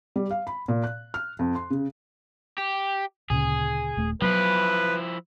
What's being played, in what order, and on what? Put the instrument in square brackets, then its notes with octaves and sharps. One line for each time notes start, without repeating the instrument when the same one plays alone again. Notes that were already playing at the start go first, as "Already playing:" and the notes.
[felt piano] G3
F5
B5
A#2
F#6
F6
F2
C6
C#3
[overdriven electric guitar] G4
[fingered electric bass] D2 A#2 C#3 [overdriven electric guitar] G#4
[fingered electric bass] D#1 A3
[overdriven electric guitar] F3 E4 [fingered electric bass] F#3 B3 [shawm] B4